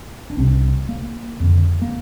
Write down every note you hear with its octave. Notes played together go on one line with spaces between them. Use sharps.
D4
C2 C3 C4
A#3
F2 D3
A#3